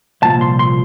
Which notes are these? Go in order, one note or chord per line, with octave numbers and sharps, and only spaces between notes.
C2 A#2 F3 A#3 A5
C6
C6